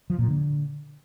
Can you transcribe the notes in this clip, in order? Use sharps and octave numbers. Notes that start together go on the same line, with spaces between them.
F3
A#2
D3